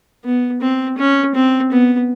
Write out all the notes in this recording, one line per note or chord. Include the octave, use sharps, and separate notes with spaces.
B3
C4
C#4
C4
B3